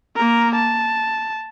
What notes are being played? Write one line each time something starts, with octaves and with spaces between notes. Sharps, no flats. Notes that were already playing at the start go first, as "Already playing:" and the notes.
A#3 A#4
A5